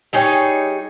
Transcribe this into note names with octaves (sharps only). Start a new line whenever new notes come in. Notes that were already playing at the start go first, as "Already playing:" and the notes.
G3 D#4 G#4 C#5